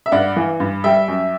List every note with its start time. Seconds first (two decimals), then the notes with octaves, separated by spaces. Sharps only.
0.06 E5
0.12 G2 D5 F#5
0.36 E3
0.60 G2
0.84 G3 E5 G5
1.08 F#2